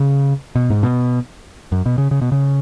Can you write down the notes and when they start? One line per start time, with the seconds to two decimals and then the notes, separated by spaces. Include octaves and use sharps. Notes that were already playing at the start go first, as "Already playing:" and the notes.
Already playing: C#3
0.55 B2
0.70 G#2
0.83 B2
1.72 F#2
1.86 B2
1.98 C#3
2.11 C#3
2.22 B2
2.32 C#3